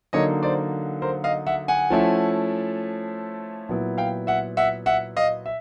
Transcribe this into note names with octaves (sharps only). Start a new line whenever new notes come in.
D3 F#3 A#3 D#4 C#5 D#5
C5 D5
A#4 C5
D#5 F5
E5 F#5
F#5 G#5
F3 A3 C#4 E4
A#2 F#3 B3 E4
F5 G5
E5 F#5
E5 F#5
E5 F#5
D#5 F5
E5